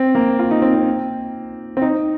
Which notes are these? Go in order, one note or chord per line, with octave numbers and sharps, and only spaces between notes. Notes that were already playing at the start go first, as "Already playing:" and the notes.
Already playing: C4
A#3
F4
D#4
C4
C4
C4
D#4